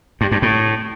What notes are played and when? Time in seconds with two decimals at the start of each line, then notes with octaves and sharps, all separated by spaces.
0.21 G2
0.32 G2
0.42 A2